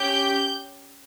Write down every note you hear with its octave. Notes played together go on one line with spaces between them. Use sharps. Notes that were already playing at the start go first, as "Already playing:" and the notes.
Already playing: C#4 G4 G6